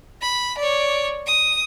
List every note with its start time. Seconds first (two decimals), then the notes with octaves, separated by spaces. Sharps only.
0.21 B5
0.58 C#5 D5
1.27 D#6